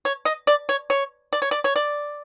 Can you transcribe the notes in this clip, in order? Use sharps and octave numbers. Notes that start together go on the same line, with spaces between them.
C#5
D#5
D5
C#5
C#5
D5
C#5
D5
C#5
D5